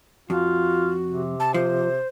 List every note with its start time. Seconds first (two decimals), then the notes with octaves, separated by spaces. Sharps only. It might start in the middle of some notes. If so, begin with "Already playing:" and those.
0.30 F2 F4 F#4
1.06 C3
1.40 A5
1.54 F3 C5